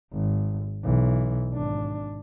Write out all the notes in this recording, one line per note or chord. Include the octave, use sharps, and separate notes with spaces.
G#1
B1 E3
G#1 D4